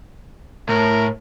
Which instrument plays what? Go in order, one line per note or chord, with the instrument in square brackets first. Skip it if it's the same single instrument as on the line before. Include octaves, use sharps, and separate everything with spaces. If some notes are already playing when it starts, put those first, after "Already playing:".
[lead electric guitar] A2 [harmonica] A#4